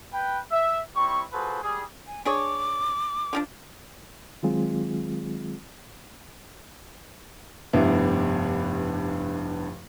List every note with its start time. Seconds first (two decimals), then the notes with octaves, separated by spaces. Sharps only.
0.13 B4 G5
0.52 E5
0.96 G3 C4 E4 C#6
1.33 F4 F#4 G#4 A4 B4 C5
1.62 G3 G#4
2.07 G#5
2.25 D4 G#4 C#5 D6
3.33 D3 F3 D4
4.43 D#3 F#3 G#3 C4 F4 G#4
7.73 F1 G2 B3 E4